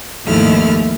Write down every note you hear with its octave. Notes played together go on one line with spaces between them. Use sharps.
D#2 G#2 F3 A3 E4 F6